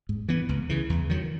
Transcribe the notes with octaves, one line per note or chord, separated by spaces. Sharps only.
G#2
E3 B3
C#2
C#3 E3
E2
D#3 F#3